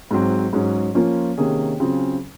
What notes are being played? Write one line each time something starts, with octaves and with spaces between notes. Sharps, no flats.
G#2 F#3 C4
G#2 F#3 C#4 G#4
F3 A#3 C#4 F4
C3 D#3 A#3 C#4 G#4
C#3 F#3 C4 F4 G#4